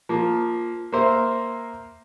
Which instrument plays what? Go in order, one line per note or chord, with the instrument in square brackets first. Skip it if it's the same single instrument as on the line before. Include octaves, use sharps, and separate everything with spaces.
[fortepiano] F3 A#3
A#3 A#4 C5 E5